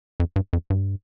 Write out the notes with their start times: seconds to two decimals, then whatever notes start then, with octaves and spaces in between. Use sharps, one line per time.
0.20 F2
0.36 G2
0.53 F2
0.70 G2